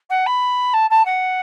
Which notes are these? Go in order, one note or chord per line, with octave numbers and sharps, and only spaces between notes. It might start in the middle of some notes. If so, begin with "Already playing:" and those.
F#5
B5
A5
A5
F#5